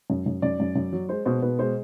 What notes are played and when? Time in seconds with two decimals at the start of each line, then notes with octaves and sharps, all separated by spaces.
0.10 F#2
0.26 F#2
0.42 F#2 D5
0.60 F#2
0.76 F#2
0.93 F#3
1.09 G#3 C5
1.25 B2 C5
1.42 B2 B4
1.59 G#3 C5